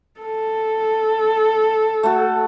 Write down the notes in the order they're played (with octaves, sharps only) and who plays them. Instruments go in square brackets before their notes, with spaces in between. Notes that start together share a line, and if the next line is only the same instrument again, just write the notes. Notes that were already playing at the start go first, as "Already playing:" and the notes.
[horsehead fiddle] A4
[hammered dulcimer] A3 F#4